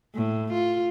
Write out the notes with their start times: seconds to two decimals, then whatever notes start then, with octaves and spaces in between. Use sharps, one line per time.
0.15 A2
0.53 F4